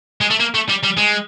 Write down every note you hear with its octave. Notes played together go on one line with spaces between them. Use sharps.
G#3
A3
A#3
A3
G3
G3
G#3